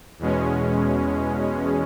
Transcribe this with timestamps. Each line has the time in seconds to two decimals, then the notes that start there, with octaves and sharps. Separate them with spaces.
0.19 E2 B2 G#3 C#4